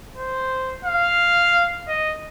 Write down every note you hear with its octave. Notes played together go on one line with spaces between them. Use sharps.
C5
F5
D#5